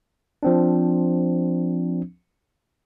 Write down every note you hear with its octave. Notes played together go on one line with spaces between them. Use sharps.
F3 C4 D4